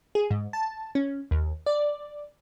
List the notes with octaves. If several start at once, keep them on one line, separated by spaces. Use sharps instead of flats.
G#4
G#2
A5
C#4
D#2
D5